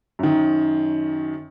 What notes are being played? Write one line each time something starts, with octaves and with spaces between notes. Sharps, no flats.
F#2 D#3